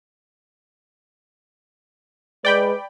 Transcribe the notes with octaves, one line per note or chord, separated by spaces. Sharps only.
G#3 B4 D5 G5 B5